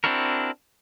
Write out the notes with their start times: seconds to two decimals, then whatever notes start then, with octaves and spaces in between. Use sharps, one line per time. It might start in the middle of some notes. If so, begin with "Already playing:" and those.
0.04 C4 D4 E4 F#4 A#4